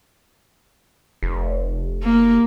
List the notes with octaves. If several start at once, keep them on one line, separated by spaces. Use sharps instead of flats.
F1
A#3